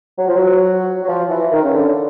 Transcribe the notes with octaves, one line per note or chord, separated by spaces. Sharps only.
F#3
F3
F#3
F#3
F3
E3
D#3
C#3
D3